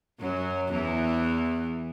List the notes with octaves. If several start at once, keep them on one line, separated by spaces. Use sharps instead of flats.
F#2 F#3
E2 E3